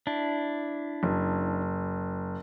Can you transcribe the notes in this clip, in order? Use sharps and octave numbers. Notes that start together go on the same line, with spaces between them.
D4 E4
F#1